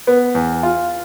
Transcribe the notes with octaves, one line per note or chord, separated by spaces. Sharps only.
B3
E2
F4